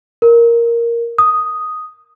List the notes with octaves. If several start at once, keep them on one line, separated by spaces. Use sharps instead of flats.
A#4
D#6